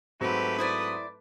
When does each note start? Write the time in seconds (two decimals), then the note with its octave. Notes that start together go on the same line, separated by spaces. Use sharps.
0.21 G#2 F#3 A3 C4 G4 B4
0.58 E4 C5 D5 D#6